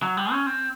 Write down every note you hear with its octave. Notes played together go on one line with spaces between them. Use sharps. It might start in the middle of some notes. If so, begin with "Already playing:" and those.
F#3
G3
C#4
C4